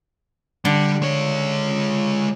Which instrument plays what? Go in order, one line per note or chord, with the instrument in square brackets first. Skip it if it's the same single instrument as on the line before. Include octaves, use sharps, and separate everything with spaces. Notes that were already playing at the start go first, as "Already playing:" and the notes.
[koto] D3 [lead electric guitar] G3
[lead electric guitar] G#3 C#5